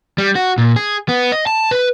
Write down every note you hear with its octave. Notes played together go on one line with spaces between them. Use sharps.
G3
F#4
A#2
G#4
B3
D#5
A5
B4